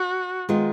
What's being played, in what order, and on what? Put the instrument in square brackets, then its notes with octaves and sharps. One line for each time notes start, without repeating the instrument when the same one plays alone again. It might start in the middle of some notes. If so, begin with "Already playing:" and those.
Already playing: [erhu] F#4
[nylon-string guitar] D#3 G#3 B3 F4